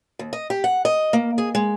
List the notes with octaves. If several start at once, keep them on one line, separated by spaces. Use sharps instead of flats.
D#2
D#5
G4
F#5
D#5
A#3
G#4
G#3